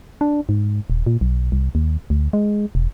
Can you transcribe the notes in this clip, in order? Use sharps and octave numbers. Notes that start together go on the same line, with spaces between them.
D4
G#2
D#1
A#2
B1
C2
D#2
D2
G#3
E1